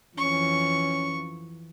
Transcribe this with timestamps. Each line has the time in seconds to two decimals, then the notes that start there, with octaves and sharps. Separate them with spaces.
0.18 F2 E3 C#4 C#6